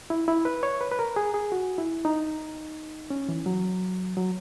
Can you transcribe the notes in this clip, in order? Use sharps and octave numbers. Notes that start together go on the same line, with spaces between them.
E4
E4
B4
C#5
B4
B4
A#4
G#4
G#4
F#4
E4
D#4
C#4
E3
F#3
F#3